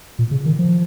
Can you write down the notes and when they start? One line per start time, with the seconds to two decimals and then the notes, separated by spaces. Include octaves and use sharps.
0.19 A#2
0.31 C#3
0.46 D#3
0.59 F3